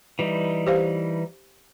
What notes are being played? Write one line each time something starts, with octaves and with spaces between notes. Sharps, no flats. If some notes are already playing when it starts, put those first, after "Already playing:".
E3 G3 D#4
G4 C5 F5